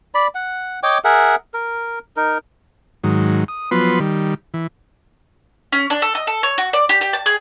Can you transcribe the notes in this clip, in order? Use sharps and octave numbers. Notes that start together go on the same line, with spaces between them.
D5 B5
F#5
C#5 D#5 G5 D6
G#4 A#4 E5 F#5
A#4
D#4 A#4
G#2 D#3 F#3
D#6
F3 F#3 B3 B4 C6
D#3 G3
E3
C#4
D4
A4
D#5
A4
C#5
F#4
D5
G4
G4
A5
G#4